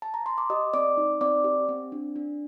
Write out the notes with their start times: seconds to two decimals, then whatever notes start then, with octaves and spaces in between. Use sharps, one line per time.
0.02 A5
0.14 A#5
0.26 C6
0.38 D6
0.50 G4 D#5 D#6
0.73 C4 D5 D6
0.97 D#4
1.21 C4 D5 D6
1.44 G4
1.69 C4
1.92 D4
2.16 D4